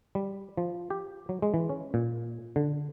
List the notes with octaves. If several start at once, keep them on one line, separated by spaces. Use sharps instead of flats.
G3
F3
G4
F#3
G#3
E3
C#4
A#2
D3